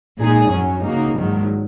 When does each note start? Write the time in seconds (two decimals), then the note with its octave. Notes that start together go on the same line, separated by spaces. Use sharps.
0.20 A#2 G#3 D#4 G#4
0.52 F#2 F#3 C#4
0.83 C#3 A#3 D#4 F#4
1.15 A#1 G#2 D#3 F#3